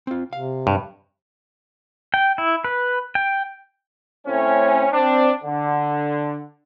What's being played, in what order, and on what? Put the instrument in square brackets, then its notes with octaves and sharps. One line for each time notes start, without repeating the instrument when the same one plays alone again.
[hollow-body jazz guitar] C4 F4
[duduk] C3 [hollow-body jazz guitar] F5
[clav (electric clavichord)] G2
[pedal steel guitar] G5
E4
B4
G5
[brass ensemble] A2 A3 C4 C#4
C4 D4
D3